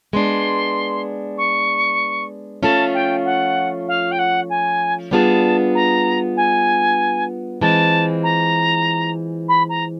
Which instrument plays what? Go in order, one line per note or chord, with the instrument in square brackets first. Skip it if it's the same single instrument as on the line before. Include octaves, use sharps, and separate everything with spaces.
[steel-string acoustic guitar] G#3 B3 D4 [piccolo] C6
[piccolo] C#6
[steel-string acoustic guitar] F3 A3 C#4 F4 [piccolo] A5
[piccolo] G5
F#5
F5
G5
F#5
G#5
[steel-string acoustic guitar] G3 B3 D4 F4 G#4 [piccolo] A5
[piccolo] A#5
G#5
[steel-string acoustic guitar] E3 G#3 C4 F4 [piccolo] A5
[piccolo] A#5
B5
A#5